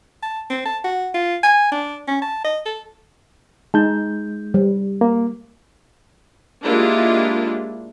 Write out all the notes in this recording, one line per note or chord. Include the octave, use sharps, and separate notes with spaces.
A5
C4
A5
F#4
F4
G#5
D4
C#4
A5
D#5
A4
G#3 D#4 A5 G6
G3
A#3
G#3 A#3 D4 E4 F4 G4